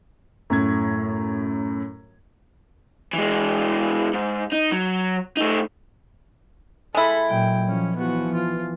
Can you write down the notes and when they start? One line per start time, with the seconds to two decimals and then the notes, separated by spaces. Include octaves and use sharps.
0.50 F#2 A2 G#6
3.14 E3 G#3
4.14 G#2
4.53 D#4
4.72 F#3
5.37 A3 D#4
6.95 G#3 E4 A4 B5
7.29 A#2 F#3 G5
7.67 F3 C#4
7.97 E3 F3 B3 F#4
8.35 F4